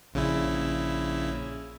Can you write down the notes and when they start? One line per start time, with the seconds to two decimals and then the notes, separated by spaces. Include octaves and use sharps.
0.14 A#1 C#3 E4